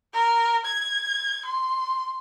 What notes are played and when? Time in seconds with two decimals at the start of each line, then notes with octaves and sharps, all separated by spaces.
0.13 A#4
0.65 G#6
1.45 C6